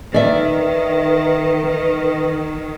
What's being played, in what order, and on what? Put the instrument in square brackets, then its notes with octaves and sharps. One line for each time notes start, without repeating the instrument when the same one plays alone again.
[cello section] D#3 [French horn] B4 [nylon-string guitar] D5 E5